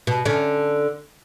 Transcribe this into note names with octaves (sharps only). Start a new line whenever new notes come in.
B2
D3 C#4